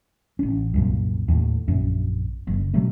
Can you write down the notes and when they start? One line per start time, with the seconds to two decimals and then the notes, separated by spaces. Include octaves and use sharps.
0.39 A1 C#4
0.74 C2 F#2 A#2
1.28 D#2 A2
1.68 A#1 F#2
2.47 F#1
2.74 B2 F#3 G#3 A3